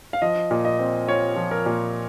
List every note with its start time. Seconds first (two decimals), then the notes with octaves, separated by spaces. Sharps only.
0.13 F5
0.22 F3 D#5
0.51 A#2
0.65 D#5
0.79 C4
1.08 F4 C#5
1.36 F3
1.51 A#4
1.66 A#2